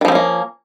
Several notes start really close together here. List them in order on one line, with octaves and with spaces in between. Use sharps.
D#3 F3 C4 C#4 A#3